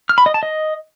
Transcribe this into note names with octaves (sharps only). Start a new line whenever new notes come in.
F6
B5
D#5
A5
D#5